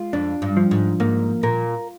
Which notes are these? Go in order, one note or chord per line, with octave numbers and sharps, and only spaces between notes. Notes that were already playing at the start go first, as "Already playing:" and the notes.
Already playing: G#3 F4
F2 D4
G2
F3
G#2
G#2 A#3
A#2 A#4